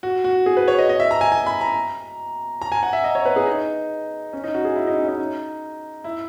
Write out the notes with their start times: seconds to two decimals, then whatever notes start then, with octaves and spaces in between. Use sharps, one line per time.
0.03 F#4
0.24 F#4
0.46 G#4
0.57 B4
0.68 C#5
0.79 D#5
0.89 D#5
1.00 E5
1.11 A#5
1.21 G#5
1.32 G#5
1.46 B5
1.61 A#5
2.62 A#5
2.72 G#5
2.83 F#5
2.93 E5
3.04 D#5
3.15 C#5
3.25 B4
3.36 G#4
3.47 D#4
4.33 C#4
4.44 D#4
4.54 F#4
4.65 G#4
4.76 E4
4.87 D#4
4.98 C#4
5.08 D#4
6.04 E4